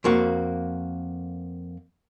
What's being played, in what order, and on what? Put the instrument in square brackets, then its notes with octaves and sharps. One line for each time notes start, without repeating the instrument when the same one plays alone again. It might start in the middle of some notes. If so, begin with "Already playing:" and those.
[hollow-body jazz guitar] F2 A#3 F#4